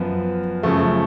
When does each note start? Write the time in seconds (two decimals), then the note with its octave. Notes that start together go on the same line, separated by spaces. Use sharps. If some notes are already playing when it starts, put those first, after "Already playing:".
Already playing: F#2 F3 B3
0.63 F#2 C#3 F3 A3 C#6